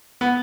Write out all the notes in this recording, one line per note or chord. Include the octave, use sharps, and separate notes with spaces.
B3